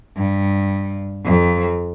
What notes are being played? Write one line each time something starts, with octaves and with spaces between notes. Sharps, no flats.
G2
F2